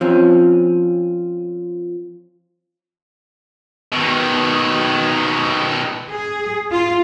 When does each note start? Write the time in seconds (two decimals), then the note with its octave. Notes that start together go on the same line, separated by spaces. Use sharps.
0.01 F3 C4 C#4
3.93 B2 D#3
6.10 G#4
6.71 F4